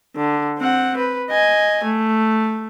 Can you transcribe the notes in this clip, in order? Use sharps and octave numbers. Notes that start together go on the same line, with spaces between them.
D3
C4 F#5
B4
D#5 G#5
A3